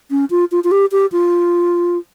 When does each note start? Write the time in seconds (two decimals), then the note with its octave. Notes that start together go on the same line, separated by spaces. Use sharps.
0.11 C#4
0.30 F4
0.52 F4
0.64 F4
0.72 G4
0.92 G4
1.12 F4